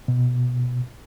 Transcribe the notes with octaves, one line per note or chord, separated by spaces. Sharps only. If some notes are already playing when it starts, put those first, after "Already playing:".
B2